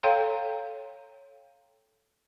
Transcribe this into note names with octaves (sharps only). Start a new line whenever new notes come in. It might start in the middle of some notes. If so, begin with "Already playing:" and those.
A4 C#5 F5 G5 A#5 C6